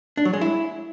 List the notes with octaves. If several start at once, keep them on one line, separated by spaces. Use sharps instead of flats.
D4
F#3
G#3
E4